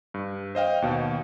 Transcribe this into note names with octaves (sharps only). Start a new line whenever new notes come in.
G2
C5 D#5 F5 G5
D#2 B2